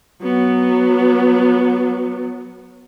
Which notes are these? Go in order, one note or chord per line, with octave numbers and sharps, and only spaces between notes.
F#3 B3